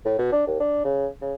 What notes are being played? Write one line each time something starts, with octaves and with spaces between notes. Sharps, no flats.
A2
B2
D4
D#2
D4
C#3
C#3